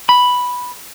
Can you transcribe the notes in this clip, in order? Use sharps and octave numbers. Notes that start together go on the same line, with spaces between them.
B5